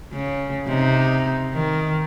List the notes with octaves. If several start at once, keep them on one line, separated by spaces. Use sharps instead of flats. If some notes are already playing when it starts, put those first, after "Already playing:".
C#3
C3 D#4
D#3